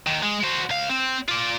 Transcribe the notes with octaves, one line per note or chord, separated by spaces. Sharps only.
D#2 D#3
G#3
F#4 C5
C#2 F5
C4
F4 D5